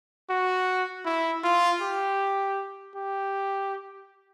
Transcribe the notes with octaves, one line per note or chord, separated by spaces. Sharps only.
F#4
E4
F4
G4
G4